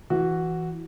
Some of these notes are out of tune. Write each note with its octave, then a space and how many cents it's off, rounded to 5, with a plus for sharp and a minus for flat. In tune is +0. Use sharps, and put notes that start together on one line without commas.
E3 +0 F#4 +0